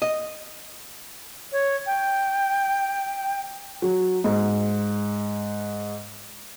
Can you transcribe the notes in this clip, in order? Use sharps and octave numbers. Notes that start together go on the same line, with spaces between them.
D#5
C#5
G5
F#3
G#2